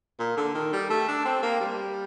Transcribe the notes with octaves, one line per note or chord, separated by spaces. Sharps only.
A#2
D3
D#3
G3
A3
D4
C4
A#3
G3